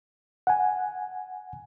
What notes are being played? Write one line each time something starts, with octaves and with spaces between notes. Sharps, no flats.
F#5 G#5